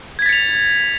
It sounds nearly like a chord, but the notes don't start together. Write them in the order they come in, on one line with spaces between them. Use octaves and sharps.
G#6 B6 A6 C#7 F7